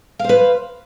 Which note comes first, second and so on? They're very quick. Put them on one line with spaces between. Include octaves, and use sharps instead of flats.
F5 C5 B4